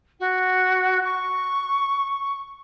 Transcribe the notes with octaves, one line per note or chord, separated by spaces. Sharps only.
F#4
C#6